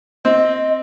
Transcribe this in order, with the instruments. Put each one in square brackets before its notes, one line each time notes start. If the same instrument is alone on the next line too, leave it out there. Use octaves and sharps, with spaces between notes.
[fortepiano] C4 [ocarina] D#5